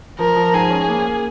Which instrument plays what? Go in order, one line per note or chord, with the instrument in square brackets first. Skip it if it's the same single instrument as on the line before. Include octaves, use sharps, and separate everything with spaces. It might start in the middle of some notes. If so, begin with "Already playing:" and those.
[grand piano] F3 [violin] A#4
[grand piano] F3
[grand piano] G#2 [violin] G#4
[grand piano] C#4
A#3